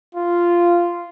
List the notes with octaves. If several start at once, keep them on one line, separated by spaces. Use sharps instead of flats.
F4